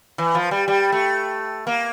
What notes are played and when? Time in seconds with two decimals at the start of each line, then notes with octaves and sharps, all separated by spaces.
0.18 E3
0.35 F3
0.51 G3
0.68 G3
0.92 A3
1.67 A#3